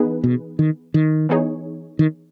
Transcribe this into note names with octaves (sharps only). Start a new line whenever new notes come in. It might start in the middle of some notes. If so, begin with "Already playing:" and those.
Already playing: E3 B3 D#4 G#4 B4
B2
D#3
D#3
E3 B3 D#4 G#4 C#5
D#3